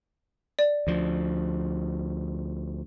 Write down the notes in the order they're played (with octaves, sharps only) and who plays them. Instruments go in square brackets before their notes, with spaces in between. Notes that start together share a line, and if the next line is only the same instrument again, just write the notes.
[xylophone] D5
[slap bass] D2 F3